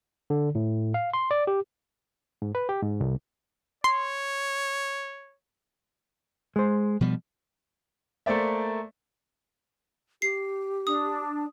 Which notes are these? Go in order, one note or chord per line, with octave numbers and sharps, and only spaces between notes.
D3
A2
F5
C6
D5
G4
G#2
B4
G4
G#2
C2
C#5 C6
G#3 C5
B2 F3 G3
A3 A#3 C5 D5 E5
G4 C7
D4 D#6